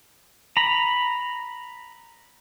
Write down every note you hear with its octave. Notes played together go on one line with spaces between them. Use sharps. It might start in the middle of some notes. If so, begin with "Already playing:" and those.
A#5 B5